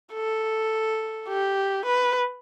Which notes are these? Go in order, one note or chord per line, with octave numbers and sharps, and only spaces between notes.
A4
G4
B4